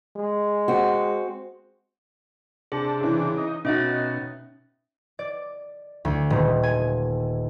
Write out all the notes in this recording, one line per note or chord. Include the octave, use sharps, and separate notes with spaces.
G#3
C4 F#4
C3 D4 G#4 A5
C#3 E3
D#4
B2 C#4 D#4 F#4 E5 A6
D5
D2
D#1
G#5